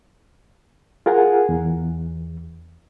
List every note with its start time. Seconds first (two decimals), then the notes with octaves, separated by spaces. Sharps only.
1.06 F4 G#4 A#4 F#5 G#5
1.49 E2